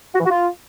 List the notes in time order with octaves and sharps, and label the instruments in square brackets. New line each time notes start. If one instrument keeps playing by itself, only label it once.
[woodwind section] F#4
E3
F#4
F4